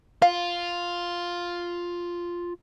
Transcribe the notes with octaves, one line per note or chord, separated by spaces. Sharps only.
F4 F5